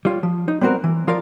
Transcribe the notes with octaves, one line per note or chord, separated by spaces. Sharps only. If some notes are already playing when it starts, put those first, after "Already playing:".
G3 F4 C#5
F3
D#4
G3 B3 C4 F#4 A#4
E3
F3 F4 A#4 D5 F5